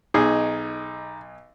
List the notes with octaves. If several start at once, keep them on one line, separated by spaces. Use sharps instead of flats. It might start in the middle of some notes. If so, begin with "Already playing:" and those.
B1 D#4 G#4